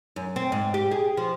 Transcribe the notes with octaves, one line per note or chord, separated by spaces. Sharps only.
F#2
C4
G#2
G4
G#4
F3